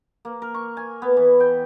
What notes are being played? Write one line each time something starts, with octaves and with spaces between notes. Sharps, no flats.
A#3
A#4
C#6
G#5
B3
E3
G5